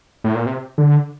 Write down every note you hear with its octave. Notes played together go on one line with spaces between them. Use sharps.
A2
A#2
C3
D3